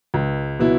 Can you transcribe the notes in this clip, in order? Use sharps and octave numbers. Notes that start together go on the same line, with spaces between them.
C#2
B2 F#3 B3 E4